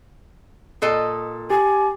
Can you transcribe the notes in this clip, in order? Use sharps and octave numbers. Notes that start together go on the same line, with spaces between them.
A#2 A4 D#5
G4 G#5